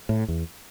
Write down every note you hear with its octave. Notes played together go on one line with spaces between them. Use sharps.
A2
E2